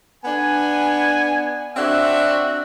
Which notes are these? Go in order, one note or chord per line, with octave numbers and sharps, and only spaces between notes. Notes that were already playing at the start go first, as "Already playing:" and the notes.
B3 D4 G#5
C4 D4 F#4 E5 F#5